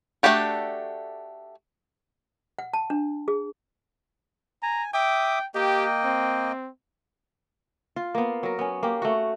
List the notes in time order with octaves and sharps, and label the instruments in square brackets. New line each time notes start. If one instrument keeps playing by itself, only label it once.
[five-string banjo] A3 D4 F#4 G4 A4
[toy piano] F#5
A5
D4
G#4
[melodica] G#5 [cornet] A#5
[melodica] E5 D6 D#6 [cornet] G5
[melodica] A#3 D#5 G5 [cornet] G4
[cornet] C4
[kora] F4
A#3 B3
F#3 A#4
B3 C#4
A#3 G4
A3 F#4